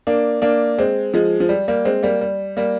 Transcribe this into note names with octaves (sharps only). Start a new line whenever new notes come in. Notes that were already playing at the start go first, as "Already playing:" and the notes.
A#3 D4
A#3 D4
G#3 C4
F3 G#3
F3
G3
G3 A#3
G#3 C4
G3 A#3
G3
G3 A#3